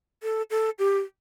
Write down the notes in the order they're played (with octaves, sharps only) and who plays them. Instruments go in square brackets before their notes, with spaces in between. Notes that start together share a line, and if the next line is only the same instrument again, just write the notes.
[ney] A4
A4
G4